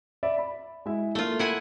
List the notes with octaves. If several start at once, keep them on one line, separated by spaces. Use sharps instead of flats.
D5 E5 B5
B5
G#3 E4 E5
A3 A#3 F4
E4 F#5 G#5